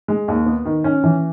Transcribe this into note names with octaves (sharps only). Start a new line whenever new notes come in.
G#3
D#2
B3
D#3
C#4
E3